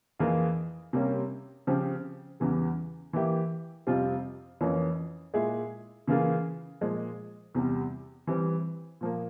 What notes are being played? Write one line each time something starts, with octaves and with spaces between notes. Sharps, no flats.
F2 E3 A#3 F4 G#4
C3 G3 A#3 C#4 G4
C#3 F3 C4 G4
E2 C#3 E3 G3
E3 A#3 E4 G4
F2 C3 G3 C4 F4
F2 E3 A#3 C#4
A#2 G#3 E4 G#4
C#3 E3 A#3 F4 G#4
A#2 F3 G#3
E2 C3 G3
E3 G3 C4
A#2 F3 A#3